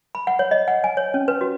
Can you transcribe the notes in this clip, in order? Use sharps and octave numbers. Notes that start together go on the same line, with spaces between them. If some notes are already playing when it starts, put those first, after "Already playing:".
B5
F#5
C#5
D#5
F#5
G#5
C#5
C#4
B4
F#4